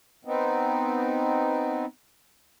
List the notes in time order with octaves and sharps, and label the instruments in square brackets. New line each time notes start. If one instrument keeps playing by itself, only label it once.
[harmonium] B3 C4 D#4